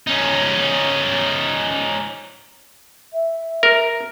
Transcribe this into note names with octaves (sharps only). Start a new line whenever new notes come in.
C#4 D#4
E5
A#4